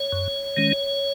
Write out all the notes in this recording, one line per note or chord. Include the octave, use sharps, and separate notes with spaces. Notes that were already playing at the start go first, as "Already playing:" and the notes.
Already playing: C#5
F#2
D#3 G#3 C#4